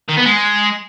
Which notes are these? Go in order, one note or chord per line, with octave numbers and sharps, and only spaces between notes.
D#3
B3
G#3